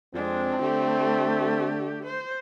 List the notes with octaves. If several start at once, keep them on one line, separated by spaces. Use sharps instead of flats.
F2 G#3 C4 D4
D3 A3 G4
C5